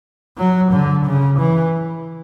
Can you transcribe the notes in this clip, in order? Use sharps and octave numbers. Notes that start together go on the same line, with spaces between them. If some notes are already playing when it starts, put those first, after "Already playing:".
F#3
D3
C#3
E3